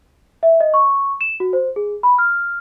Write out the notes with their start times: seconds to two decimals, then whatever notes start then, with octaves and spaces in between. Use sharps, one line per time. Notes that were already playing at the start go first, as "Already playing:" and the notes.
0.43 E5
0.60 D#5
0.74 C#6
1.21 E7
1.40 F#4
1.53 C5
1.76 G#4
2.03 B5
2.19 F6